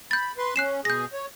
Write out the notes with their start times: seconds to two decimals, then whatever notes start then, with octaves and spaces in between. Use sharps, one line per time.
0.11 B5 G6 A6
0.38 B4 C6
0.56 C#4 F#6 C7 E7
0.85 B2 G#4 G6 A#6
1.13 C#5